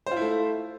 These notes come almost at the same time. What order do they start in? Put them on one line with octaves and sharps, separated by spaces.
C5 F4 E4 A3